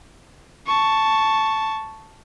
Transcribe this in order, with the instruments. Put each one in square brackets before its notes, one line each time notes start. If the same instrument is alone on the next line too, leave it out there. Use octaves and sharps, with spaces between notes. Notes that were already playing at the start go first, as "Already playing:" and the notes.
[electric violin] A5 C#6